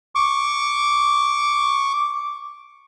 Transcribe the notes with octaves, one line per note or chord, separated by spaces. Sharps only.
C#6 D6